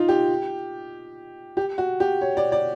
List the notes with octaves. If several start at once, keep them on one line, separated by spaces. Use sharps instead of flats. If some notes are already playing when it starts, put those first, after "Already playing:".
Already playing: D#4 F4
G4
G4
F#4
G4
C#5
D5
D5